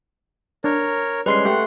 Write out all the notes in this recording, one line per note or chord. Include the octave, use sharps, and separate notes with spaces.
D4 A#4 C#5
G3 G#3 C#4 B4 C6 C7
A3 G4 F#5